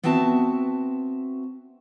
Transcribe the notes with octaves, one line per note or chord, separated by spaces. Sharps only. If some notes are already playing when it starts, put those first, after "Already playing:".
B3 C4 F#4 E5 A5